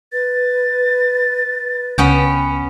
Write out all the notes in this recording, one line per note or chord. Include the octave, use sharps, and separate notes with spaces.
B4 A6
C#2 B3 C#4 G5